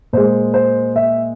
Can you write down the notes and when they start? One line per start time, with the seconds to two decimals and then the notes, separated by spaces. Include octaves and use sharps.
0.13 A#2 G#3 C5
0.54 C5
0.96 E5